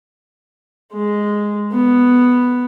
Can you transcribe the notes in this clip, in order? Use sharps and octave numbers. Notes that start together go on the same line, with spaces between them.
G#3
B3